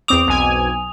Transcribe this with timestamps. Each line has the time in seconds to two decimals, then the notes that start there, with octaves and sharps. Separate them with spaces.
0.08 E2 C4 D6 D#6 F7
0.27 B1 G#5